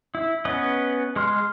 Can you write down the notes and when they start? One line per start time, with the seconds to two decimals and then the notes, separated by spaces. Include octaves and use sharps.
0.15 E4
0.45 B3 C#4 B4 D#5
1.16 G#3 C6 F6